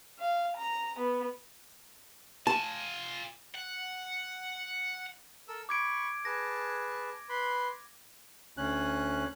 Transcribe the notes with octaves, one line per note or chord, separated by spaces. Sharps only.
F5
A#5
B3
F4 G#5 A5
F#5
A4 A#4 E6
B5 C#6 D6 G#6 D7
G#4 B4 A5 A#6
B4 B5 C6
D2 C#4 F#6